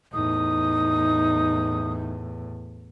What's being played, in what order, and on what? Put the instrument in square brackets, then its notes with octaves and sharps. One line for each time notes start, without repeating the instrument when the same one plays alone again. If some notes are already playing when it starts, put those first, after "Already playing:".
[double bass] E2 A2 [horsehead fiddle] D#4 [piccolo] D#6